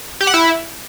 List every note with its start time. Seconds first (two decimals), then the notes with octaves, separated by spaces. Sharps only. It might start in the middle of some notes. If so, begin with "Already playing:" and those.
0.21 G4
0.27 F#5
0.34 E4